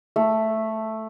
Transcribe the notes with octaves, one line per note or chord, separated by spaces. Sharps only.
A3